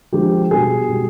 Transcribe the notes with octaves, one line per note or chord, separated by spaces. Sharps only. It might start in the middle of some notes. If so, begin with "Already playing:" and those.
D3 F3 G#3 G4
B2 G3 G#4
B2 G3